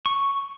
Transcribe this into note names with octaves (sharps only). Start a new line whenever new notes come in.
C#6